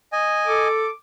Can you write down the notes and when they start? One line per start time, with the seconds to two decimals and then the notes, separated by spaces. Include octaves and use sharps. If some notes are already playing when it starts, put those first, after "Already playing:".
0.12 D#5 G#5
0.47 A4 D6